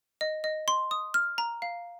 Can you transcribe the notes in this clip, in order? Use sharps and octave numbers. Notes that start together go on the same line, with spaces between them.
D#5
D#5
C6
D#6
F6
A#5
F5